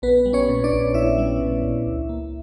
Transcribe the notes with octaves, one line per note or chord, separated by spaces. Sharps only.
A#1 B3 B4
G3
C#4 C#5
A#2
D4 D5
A#1
A#1 E4 E5
G3
A#2
A#1
C#2
A#3